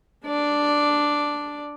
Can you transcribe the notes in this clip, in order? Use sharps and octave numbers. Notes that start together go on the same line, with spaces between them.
D4 D5